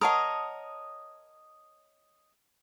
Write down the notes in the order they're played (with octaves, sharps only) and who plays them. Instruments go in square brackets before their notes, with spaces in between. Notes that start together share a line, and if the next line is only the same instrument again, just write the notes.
[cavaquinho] A#4 C#5 D#5 [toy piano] F#5 A5 D#6